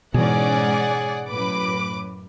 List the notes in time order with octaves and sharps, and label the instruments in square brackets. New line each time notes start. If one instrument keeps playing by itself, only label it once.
[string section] G#2 C#4 [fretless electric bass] B2 E3 [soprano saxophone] G#4 [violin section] D5 F#5
[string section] F#2 A2 [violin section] B4 D6